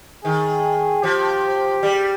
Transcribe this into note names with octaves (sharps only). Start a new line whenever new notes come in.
D#3 G#4
F3 G4
G3